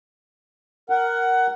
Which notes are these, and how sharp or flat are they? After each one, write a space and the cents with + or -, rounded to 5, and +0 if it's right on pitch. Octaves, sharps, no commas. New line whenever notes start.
A#4 +0 F#5 +15